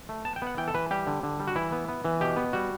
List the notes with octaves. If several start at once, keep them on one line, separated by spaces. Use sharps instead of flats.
A3
B3 A5
G5
B3 F#5
E3 G5
A4
E3 B4
G3 G4
D3
D3
G3
F#4
E3 E4
B3
B3
E3
B2 G4
B3
G3 F#4